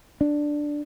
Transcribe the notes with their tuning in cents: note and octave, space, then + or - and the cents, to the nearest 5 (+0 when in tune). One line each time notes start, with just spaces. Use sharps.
D4 +5